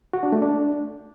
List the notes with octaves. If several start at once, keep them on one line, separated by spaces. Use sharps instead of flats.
F#4
D4
A3
D4